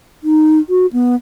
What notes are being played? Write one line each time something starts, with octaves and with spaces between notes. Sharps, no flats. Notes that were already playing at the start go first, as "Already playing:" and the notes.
D#4
F#4
B3